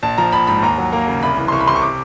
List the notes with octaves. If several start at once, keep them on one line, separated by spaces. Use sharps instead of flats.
A#1 A5
F3 A#5
A#1 B5
G#2 B5
D#2 A#5
F#3
A#3 A#5
C#3
C2 B5
E3
C6
C2 C#6
B5
C3 C6
C#6
D6